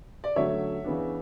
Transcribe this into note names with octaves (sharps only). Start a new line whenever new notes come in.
D5
D3 F#3 A3 C#4 C#5 E5
C#3 E3 B3 D4